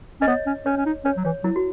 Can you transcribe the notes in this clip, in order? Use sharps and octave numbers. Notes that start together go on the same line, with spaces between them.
C#4 D#5
B3 C#5
C#4
C#4 C#5
C#4
D#4
C#4 C#5
F#3
E3 C#5
F#3 E4
F#4